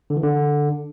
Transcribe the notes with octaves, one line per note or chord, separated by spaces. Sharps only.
D3
E3
D3